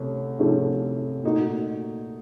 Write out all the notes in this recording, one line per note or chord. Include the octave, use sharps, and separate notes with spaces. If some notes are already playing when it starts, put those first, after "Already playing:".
Already playing: C2 C3 A3 C#4
C2 C3 F3 A3 C#4
A#2 A3 D#4 F#4